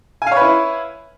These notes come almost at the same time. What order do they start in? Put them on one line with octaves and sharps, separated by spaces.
G#5 F5 C#5 B4 E4